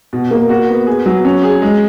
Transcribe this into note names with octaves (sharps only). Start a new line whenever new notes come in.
B2
A#3
F#4
B3
G#4
F#3
C#4
G#4
G#3